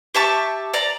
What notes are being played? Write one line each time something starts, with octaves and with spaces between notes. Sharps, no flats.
G4 E5 A5 C#6
D5 A#5